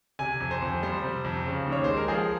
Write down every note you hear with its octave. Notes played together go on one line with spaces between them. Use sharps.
C3 G#5
F2
C5
F2
G3 C5
C3
F2
C#3
D#2
C#5
G#3 C5
A#4
F3 G#4